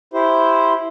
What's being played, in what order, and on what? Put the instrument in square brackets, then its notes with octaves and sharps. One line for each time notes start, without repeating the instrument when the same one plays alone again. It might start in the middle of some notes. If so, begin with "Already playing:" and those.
[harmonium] E4 G4 C5